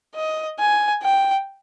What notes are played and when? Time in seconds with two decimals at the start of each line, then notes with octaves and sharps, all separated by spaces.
0.15 D#5
0.60 G#5
1.02 G5